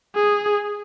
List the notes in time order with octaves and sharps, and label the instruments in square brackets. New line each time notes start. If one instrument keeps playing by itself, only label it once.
[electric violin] G#4